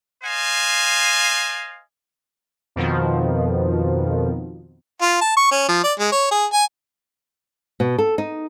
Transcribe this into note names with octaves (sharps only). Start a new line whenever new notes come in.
C5 D#5 F5 G#5
F2 B2 D#3 F3
F4
A5
C#6
C#4
F3
D5
G#3
C#5
G#4
G#5
B2
A4
D#4